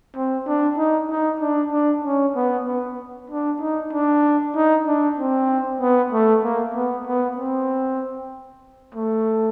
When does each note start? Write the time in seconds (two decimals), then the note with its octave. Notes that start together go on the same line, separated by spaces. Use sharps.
0.16 C4
0.47 D4
0.78 D#4
1.10 D#4
1.41 D4
1.72 D4
2.05 C#4
2.36 B3
2.67 B3
3.30 D4
3.61 D#4
3.93 D4
4.56 D#4
4.87 D4
5.18 C4
5.81 B3
6.12 A3
6.44 A#3
6.75 B3
7.07 B3
7.38 C4
8.95 A3